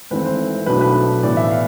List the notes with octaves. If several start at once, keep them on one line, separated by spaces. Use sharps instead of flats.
G#1 G#2 E3 A3 C4 B4
C5
B1 B2 A3 D4 B4
B4
A2 E3 B3 D5
E5
F5